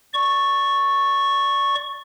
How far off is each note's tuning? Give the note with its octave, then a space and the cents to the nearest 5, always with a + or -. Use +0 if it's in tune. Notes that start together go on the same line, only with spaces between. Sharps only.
D5 +0 C#6 -5